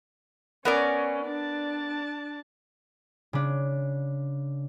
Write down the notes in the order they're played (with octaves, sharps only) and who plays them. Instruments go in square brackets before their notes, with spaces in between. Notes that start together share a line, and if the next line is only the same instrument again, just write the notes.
[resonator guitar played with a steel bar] B3 A#4 D5 [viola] C#4
[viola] D4 A5
[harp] C#3 D4